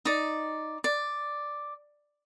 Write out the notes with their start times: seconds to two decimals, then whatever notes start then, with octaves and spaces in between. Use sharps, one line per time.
0.05 D#4 D5
0.84 D5